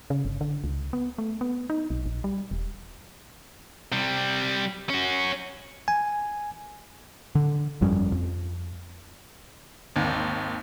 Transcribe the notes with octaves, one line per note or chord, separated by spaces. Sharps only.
C#3
G1
D3
C#2
B3
A3
B3
D#4
B1
A#1
G3
E1
C3 G3
C#4 F#4
G#5
D3
G1 F2 G3 C#4
F2
G#1 D#2